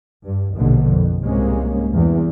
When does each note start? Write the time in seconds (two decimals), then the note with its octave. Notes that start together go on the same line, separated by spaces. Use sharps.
0.24 G2
0.56 A#1 D#2 B2 D3
0.90 F2
1.22 C2 G#2 C3 G#3 A#3 C#4
1.93 E2 G2